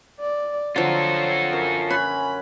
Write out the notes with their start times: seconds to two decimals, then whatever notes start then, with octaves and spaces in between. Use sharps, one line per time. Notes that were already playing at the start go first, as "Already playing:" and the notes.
0.20 D5
0.76 D3 F3 F#3 F4 A4 C#5
1.53 F#2
1.90 C#4 B4 G#5 B5 C6